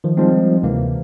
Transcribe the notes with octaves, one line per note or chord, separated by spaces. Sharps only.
D#3 F3
F3 G3 G#3 C4 D#4
D2 C3 E3 A#3